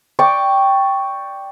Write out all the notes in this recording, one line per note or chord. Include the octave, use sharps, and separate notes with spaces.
D5 G5 C#6 D6